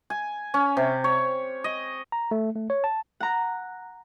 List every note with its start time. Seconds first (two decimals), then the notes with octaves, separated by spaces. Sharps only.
0.10 G#5
0.54 C#4
0.77 C3
1.04 C#5
1.64 D#5
2.12 A#5
2.31 A3
2.55 A3
2.70 C#5
2.84 A5
3.20 F#5 A#5